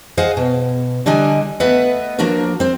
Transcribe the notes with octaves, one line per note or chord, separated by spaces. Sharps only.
G#4 C5 D#5 F5 F#5
B2
D3 G3 D4 D#5 G#5
A3 B3 B4 D#5 E5 F#5
F3 A#3 D4 F#4 A#4
C4 C5